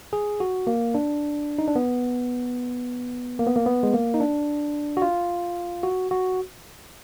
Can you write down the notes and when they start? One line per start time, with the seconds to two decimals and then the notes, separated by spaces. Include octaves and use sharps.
0.13 G#4
0.40 F#4
0.67 A#3
0.94 D4
1.58 D#4
1.68 D4
1.76 B3
3.39 A#3
3.47 B3
3.56 A#3
3.66 B3
3.83 G#3
3.93 A#3
4.14 D#4
4.20 D4
4.97 F#4
5.02 F4
5.83 F#4
6.11 F#4